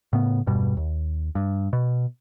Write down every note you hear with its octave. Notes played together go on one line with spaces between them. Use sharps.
A2 C#3 B3
E1 G2 B2 G3
D#2
G2
B2